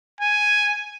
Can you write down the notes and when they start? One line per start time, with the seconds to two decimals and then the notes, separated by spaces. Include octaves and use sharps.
0.21 G#5